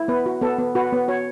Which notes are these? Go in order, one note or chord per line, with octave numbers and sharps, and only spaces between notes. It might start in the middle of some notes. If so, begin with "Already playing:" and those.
Already playing: E4
B3 B4
F#4
B3 A4
B3
F#4 B4
B3
F#4 C#5